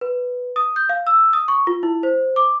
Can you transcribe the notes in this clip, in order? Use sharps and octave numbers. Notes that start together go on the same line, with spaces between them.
B4
D#6
G6
F5
E6
D#6
C#6
F4
E4
C5
D6